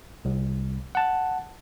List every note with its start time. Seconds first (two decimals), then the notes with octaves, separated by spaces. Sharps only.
0.25 C2
0.95 F#5 A5